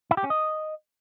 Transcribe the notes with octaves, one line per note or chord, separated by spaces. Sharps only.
E4
G4
C#4
D#5